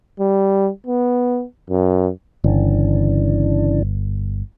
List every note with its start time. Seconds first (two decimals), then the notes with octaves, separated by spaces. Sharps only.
0.20 G3
0.87 B3
1.70 F#2
2.44 G1 C#3 E3 D4